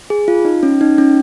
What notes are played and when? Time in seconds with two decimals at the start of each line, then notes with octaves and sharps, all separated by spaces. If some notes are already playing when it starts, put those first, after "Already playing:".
0.10 G#4
0.28 F4
0.45 D#4
0.63 C#4
0.81 D#4
0.98 C#4